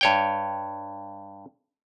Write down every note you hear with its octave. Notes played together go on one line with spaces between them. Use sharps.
G2 C#5 G5